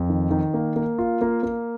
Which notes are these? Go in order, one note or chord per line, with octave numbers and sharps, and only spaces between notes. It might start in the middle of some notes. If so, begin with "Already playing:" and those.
Already playing: F2
D#3
D#3
A#3
A#3
F4
A#3
A#3